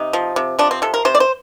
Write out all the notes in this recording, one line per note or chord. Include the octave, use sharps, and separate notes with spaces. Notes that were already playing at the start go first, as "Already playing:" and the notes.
Already playing: C3 D#4
F3
C3
F3 D4
C4
C3 A4
A#4
C3 C5
D5
C5